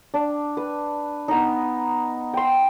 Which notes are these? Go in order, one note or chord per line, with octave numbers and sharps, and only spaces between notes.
D4
B4
B3 D#4
G5 C6